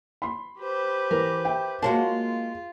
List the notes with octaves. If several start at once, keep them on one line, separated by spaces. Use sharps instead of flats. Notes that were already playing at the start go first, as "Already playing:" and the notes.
B5 C6
G4 B4 C5
E3 A#4
E5 G5
G#3 A#3 F4 F#4 C#5 A5